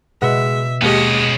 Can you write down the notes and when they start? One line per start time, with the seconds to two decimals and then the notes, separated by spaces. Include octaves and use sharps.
0.22 B2 G#3 B4 E5 F#5
0.81 D#2 G#3 B3 C#4 G4 D#5